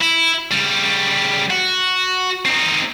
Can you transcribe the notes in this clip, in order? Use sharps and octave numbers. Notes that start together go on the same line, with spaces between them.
E4
C#3 G3
F#4
C4 D#4